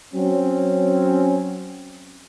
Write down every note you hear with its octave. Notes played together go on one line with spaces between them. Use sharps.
F#3 C4 C#4